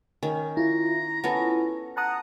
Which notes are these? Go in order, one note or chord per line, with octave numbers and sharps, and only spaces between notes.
D#3 C#4
E4 F4 A#5
B3 C#4 A4
F#5 A5 A#5 D#6